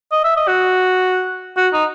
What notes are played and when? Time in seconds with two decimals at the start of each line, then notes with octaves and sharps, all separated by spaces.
0.12 D#5
0.24 E5
0.37 D#5
0.48 F#4
1.57 F#4
1.73 D#4